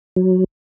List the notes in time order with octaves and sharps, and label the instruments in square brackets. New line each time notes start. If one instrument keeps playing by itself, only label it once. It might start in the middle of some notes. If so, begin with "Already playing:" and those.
[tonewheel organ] F#3